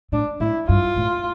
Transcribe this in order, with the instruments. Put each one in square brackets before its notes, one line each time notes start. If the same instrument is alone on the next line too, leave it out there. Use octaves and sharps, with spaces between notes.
[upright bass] A2 [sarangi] D4
[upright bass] A2 [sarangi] E4
[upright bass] G2 [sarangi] F4
[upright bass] A2